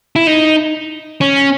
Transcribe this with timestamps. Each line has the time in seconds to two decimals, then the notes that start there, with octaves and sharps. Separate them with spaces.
0.16 E4
0.27 D#4
1.21 C#4